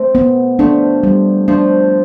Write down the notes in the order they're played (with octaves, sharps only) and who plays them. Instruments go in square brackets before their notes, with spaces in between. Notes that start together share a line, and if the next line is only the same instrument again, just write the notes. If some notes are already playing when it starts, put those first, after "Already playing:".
Already playing: [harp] A3 C4
[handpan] B3
[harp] F3 A3 [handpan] D4
[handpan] G3
[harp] F3 A3 [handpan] D4